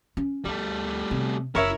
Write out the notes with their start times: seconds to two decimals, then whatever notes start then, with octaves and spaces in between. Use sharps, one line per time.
0.17 C#4
0.45 D2 G3 A3
1.11 C3
1.55 F#1 C#3 E4 A#4 C#5 E5